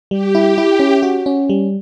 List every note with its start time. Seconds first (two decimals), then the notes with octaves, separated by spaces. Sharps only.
0.11 G3 G4
0.35 E4
0.58 E4
0.79 C#4
1.03 F#4
1.26 C#4
1.49 G3